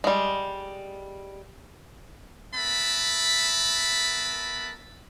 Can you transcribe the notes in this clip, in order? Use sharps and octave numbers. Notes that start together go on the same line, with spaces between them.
G3 G#3
B3 A#4 E5 A5 B5